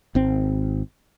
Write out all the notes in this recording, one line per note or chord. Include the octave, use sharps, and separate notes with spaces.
G#1 C4